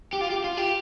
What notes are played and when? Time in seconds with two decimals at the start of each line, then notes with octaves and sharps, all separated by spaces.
0.13 G4
0.21 F4
0.30 G4
0.44 F4
0.57 G4